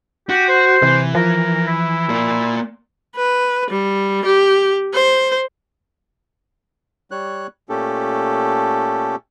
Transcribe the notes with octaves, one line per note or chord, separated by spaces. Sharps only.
F#4 G4
C5
C3 E3
F3 A#4
E4
A#3 D5
B4
G3
G4
C5
G3 C#5 F#6
A#2 A3 C#4 G4 A4